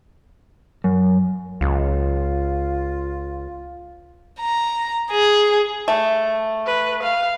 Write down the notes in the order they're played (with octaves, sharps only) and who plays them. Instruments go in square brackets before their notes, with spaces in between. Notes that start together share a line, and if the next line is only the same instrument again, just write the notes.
[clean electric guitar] F#2
[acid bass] C#2 [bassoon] F4
[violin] A#5
G#4
[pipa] A3
[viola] B4
F5